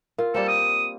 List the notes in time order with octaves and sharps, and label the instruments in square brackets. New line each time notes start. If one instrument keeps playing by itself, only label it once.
[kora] F4 [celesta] A#4
[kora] G3 A#3 C4 [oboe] A4
[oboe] D#6